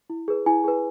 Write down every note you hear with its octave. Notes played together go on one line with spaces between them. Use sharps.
E4
G#4 B4
E4 G#5
G#4 B4